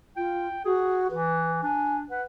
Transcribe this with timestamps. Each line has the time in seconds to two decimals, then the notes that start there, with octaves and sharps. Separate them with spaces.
0.17 F4 G5
0.65 F#4 G#4
1.11 E3 B4
1.63 D4 G#5
2.10 B4 F#5